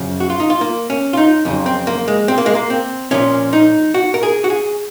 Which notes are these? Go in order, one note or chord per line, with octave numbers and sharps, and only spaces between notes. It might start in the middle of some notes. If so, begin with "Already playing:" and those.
Already playing: F#2 C#3 F3
F#4
F4
D#4
F4
A#3
C#4
F4
D#4
F2 C#3 F#3
C4
A#3
G#3
C4
A#3
G#3
A#3
C4
A#2 F3 C#4
D#4
F#4
A#4
G#4
F#4
G#4